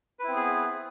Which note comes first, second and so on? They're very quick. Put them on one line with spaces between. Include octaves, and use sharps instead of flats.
B4 E4 C4 B3 G#4